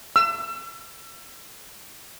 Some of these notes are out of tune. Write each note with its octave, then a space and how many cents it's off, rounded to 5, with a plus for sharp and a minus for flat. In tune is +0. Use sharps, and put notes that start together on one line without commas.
E6 +40